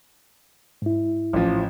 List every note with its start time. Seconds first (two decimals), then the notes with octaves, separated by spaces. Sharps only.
0.82 G#2 E4
1.33 A1 F3